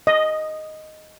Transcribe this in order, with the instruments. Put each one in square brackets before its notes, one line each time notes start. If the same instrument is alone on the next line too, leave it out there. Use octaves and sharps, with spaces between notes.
[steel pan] D#5